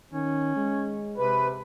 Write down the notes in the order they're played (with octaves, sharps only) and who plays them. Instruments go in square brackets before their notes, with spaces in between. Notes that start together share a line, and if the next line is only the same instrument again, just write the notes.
[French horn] D#3 [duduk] C#4
[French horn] G#3
[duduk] C3 [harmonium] B4